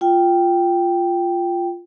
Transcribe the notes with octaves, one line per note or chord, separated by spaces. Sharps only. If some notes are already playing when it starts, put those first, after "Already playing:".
F4 G5